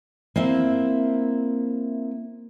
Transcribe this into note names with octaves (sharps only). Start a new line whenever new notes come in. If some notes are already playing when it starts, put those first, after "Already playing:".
A#3 C4 E4 E5